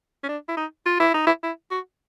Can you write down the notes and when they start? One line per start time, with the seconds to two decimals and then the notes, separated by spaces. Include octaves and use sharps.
0.23 C#4
0.29 D4
0.48 E4
0.57 D#4
0.86 F4
1.00 E4
1.14 D#4
1.27 E4
1.43 E4
1.71 F#4